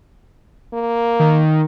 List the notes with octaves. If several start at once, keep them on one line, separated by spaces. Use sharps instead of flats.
A#3
D#3